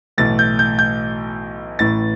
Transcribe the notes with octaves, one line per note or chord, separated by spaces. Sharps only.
B1 A2 E3 A3 A6
G6
G6
G6
A1 A2 E3 A6